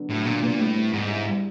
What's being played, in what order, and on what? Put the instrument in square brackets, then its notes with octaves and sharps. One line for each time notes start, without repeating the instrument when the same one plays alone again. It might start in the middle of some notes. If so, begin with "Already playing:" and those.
Already playing: [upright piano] D3 F#3 B3 D4
[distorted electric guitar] A2 [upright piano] F#3
[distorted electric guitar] A#2 [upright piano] D3
[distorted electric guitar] A#2 [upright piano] B3
[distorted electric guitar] A2 [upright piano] G3
[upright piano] C4
[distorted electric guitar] G#2 [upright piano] G3
[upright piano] E4
G3